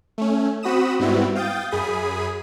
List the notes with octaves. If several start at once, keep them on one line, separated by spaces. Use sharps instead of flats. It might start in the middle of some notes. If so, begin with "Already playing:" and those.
A3 C#4
C4 F#4 B5 D#6 E7
G#2 G3 B3 C4 E4 F#4
F5 G5 D#6 G6 A6
F#2 G#4 B5 D#6